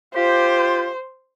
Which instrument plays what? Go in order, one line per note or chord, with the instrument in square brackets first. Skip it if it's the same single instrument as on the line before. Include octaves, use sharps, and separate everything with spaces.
[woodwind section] F4 G4 [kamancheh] C5